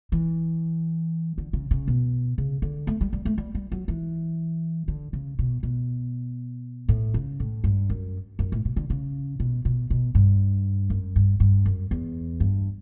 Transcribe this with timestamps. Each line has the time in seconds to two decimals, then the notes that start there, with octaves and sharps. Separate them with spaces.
0.12 E3
1.38 D3
1.53 C#3
1.71 C#3
1.88 B2
2.38 C#3
2.62 D3
2.87 A3
3.01 G3
3.13 G3
3.25 A3
3.38 G3
3.55 G3
3.72 F#3
3.88 E3
4.88 D3
5.13 C#3
5.39 B2
5.63 B2
6.89 A2
7.14 C#3
7.40 A2
7.64 G2
7.90 F#2
8.39 F#2
8.52 A2
8.65 B2
8.76 D3
8.90 C#3
9.40 B2
9.65 B2
9.90 B2
10.15 G2
10.90 F#2
11.16 G2
11.40 G2
11.66 F#2
11.91 E2
12.40 G2